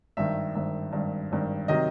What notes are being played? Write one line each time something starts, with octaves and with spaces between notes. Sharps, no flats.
G#1 G2 D#3 E5
G#1 G2 D#3 E5
G#1 G2 D#3
G#1 G2 D#3
C3 D#3 F#3 D#5